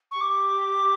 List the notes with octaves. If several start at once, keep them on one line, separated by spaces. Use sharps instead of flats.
C#6
G4 D6